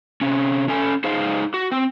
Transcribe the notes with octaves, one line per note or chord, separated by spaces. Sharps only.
C3 C#4
C#4 A4 G#5
D#4 G#4 C5 F5
F#4
C4